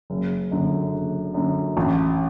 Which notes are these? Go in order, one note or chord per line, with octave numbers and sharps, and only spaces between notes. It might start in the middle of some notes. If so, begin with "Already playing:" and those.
F#1
F#2 D3
F#1
F#2 D3
A1